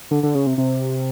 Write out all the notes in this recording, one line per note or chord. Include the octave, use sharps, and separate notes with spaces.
D3
D3
C#3
C3
C3